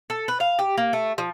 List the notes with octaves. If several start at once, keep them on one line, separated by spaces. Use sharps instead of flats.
A4
B4
F5
G4
A#3
A3
F3